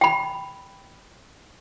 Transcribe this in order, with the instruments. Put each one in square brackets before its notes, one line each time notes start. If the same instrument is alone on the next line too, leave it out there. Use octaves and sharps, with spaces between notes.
[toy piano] G5 B5